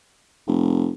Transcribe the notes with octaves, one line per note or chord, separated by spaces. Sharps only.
F1